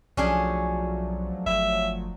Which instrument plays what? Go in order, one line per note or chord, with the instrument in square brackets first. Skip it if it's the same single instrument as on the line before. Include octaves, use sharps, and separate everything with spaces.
[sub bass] B1 [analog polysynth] F3 F#3 A3 [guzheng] C#4 D4 G#4
[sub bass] G1 [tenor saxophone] E5